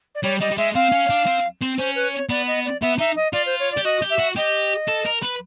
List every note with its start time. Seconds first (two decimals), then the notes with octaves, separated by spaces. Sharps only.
0.15 D5
0.23 G3 C#5
0.40 G3 D#5
0.51 G3
0.57 G#3 E5
0.75 C4 F5
0.92 C#4
1.10 D4
1.26 C4
1.61 C4
1.78 C#4 C5
1.95 B4
2.13 C#5
2.30 B3 D5
2.48 D#5
2.65 D5
2.82 B3 E5
2.98 D#4 E5
3.16 D#5
3.33 F4 D5
3.46 C5
3.60 C#5
3.72 D5
3.77 G4
3.85 F#4 D#5
4.02 G4
4.10 E5
4.19 F#4
4.36 G4 D#5
4.88 A4
5.06 A#4
5.22 B4